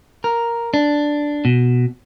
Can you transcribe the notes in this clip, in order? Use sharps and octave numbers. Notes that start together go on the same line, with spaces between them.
A#4
D4
B2